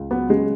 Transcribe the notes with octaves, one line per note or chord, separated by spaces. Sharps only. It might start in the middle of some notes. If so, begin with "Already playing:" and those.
Already playing: C#2
F#3 B3
C#3 G#3